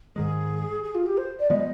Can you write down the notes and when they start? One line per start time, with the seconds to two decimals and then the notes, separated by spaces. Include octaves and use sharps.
0.16 G#2 D#3 G#3 G#4
0.83 G#4
0.94 F4
1.06 G4
1.17 C5
1.39 D5
1.50 F3 G#3 B3 D#5